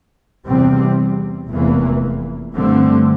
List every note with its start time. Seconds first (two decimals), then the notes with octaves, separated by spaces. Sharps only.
0.45 E2 C3 G3 C4
1.49 F1 E2 E3 A#3
2.54 G2 D3 A3 C4